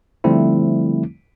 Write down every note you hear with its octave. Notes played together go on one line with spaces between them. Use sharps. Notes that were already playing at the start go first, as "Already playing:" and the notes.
D3 F3 G3 A3 C4 E4